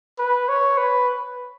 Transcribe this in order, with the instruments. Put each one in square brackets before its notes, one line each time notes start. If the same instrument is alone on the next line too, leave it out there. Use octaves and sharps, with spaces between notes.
[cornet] B4
C#5
B4